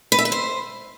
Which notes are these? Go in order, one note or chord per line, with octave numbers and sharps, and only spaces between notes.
B4
E5
B4
C5